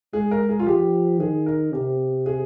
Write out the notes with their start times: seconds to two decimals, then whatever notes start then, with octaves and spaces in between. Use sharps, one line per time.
0.13 G#3 G#4
0.31 A#4
0.49 G#4
0.59 F4
0.66 F3 G4
1.20 D#3 G#4
1.46 A#4
1.72 C3 G4
2.26 G#4